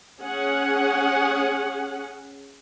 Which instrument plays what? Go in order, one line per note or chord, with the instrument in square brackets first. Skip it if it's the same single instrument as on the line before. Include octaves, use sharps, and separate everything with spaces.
[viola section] C#4 G#4 F#5